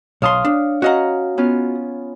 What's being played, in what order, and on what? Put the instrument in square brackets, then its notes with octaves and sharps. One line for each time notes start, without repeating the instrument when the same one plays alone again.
[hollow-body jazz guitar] B1 A5 C6 [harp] C#5 F5 D#6
[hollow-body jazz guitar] D4
[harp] C#4 F5 A#5 [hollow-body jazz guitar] F#4 D#5 F#5
[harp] B3 C#4 F4